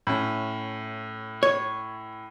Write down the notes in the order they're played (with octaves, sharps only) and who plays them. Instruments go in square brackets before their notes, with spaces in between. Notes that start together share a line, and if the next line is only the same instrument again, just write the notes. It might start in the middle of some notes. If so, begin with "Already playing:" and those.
[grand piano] A2 C#4
[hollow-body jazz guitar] C#5